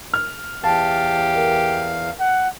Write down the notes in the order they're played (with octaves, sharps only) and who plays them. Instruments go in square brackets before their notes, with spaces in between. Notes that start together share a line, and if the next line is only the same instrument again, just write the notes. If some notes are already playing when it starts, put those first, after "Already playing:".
[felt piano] F6
[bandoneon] E2 F5 [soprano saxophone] G4 [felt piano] A5
[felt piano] A#4
[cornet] F#5